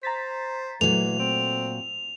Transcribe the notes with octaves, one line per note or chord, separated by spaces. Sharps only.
C5 A#5 A6 B6
A#2 E3 F#3 A3 F7
C4